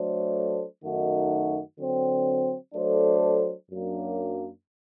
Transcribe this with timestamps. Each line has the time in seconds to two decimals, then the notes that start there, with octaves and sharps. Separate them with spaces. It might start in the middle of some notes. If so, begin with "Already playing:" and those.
Already playing: F#3 A3 D4 A4 C5
0.83 F#2 D#3 A3 D#4 F#4
1.79 D3 F#3 C4
2.75 F#3 A3 D4 A4 C5
3.72 F#2 F#3 A#3 D4